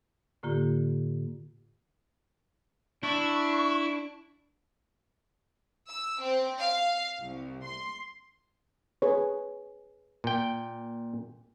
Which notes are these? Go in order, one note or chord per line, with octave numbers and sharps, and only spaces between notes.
A2 D3 A#3 F4 G4
D4 E4 C#6
E6
C4
F5
C2
C6
G#4 B4 C#5
A#2 G5